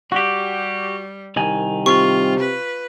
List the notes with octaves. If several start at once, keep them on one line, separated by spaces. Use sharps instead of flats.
G3 F#4 G4
C2 D#3 G#5
C3 F4 C#6
B4